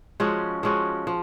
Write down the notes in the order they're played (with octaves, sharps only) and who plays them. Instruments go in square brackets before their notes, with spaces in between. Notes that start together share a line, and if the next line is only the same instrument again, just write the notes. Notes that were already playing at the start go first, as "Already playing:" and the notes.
[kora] F3 G#3 C#4 F#4
F3 G#3 C#4 F#4
F3